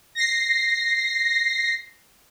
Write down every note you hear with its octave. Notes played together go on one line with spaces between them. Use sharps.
A#6 C7